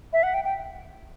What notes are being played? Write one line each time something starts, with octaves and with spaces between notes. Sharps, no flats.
E5
F#5
G5
G5